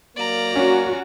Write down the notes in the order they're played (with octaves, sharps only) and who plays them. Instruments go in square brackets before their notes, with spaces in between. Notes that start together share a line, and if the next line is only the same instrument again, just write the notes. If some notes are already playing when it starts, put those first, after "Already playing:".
[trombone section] F#3 A#3 [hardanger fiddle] D5 A#5
[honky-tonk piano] C#4 [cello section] F#4